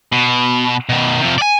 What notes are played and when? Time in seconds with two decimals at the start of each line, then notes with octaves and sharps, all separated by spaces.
0.12 B2
0.89 B2 D#3
1.21 C3 F3
1.38 D5 G#5